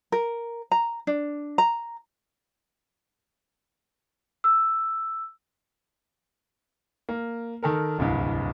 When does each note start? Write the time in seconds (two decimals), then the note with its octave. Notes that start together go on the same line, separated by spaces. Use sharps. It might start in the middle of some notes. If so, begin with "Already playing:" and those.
0.12 A#4
0.71 A#5
1.07 D4
1.58 A#5
4.44 E6
7.09 A#3
7.63 D#3 A4 A#4
7.98 D1 C2 G2